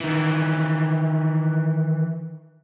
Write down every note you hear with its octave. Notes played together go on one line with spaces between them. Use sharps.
D#3 E3